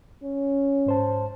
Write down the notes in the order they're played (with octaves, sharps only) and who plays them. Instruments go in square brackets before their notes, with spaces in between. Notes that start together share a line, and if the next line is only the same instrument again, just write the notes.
[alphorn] C#4
[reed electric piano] G#2 C5 A5